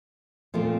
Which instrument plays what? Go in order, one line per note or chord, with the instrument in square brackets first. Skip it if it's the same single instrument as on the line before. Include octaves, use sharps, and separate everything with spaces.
[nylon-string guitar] A#2 F3 A3 C4